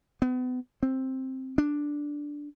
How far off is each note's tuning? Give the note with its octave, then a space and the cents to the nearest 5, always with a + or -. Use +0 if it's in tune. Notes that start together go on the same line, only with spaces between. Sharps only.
B3 +35
C4 +5
D4 -5